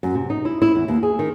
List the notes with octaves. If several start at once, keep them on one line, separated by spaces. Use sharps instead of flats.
F#2
C3
D#4
E4
E4
E2
D#2
G#4
D#3